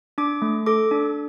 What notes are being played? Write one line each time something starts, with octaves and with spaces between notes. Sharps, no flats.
D4 D6
A3
A4 D6
D4